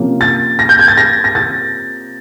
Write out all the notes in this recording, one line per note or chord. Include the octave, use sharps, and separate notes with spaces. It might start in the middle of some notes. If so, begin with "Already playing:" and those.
Already playing: C3 F3 A#3 C#4
A6
A#6
G6
G#6
A6
A#6
A#6
A6